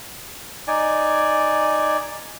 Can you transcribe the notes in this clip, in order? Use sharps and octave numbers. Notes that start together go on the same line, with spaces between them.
D#4 D5 G#5